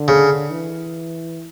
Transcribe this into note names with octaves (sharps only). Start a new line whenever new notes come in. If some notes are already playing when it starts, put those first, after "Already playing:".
Already playing: D3
C#3
E3